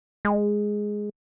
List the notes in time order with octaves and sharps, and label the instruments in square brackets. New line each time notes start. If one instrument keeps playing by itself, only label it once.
[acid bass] G#3